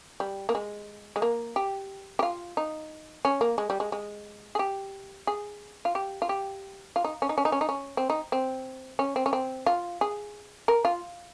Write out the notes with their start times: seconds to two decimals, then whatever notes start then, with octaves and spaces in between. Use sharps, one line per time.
0.20 G3
0.49 A#3
0.55 G#3
1.16 G#3
1.22 A#3
1.56 G4
2.19 G4
2.23 F4
2.57 D#4
3.25 C#4
3.41 A#3
3.58 G#3
3.70 G3
3.80 G#3
3.92 G#3
4.55 G#4
4.59 G4
5.27 G#4
5.85 F4
5.95 G4
6.22 F4
6.29 G4
6.96 F4
7.04 D#4
7.22 C#4
7.29 D#4
7.38 C#4
7.45 D#4
7.52 C#4
7.61 D#4
7.69 C#4
7.97 C4
8.10 D#4
8.32 C4
8.99 C#4
9.16 C4
9.26 C#4
9.33 C4
9.66 F4
10.01 G#4
10.68 A#4
10.85 F4